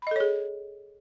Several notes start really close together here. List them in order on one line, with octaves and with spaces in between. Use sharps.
B5 D#5 A4 C#5 G#4